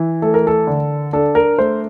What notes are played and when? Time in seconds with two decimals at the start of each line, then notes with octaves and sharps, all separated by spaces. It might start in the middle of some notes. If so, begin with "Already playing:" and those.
Already playing: E3
0.22 A3 A4
0.34 A#4
0.47 A4
0.67 D3
1.13 D4 A4
1.35 A#4
1.58 A3 C5